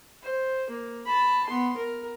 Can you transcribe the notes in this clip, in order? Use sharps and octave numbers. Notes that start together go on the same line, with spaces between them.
C5
A#3
A5 B5
B3 C6
A#4